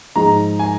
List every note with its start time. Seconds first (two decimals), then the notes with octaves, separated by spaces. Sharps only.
0.16 G#2 F3 G#3 D#4 A#5
0.59 G#5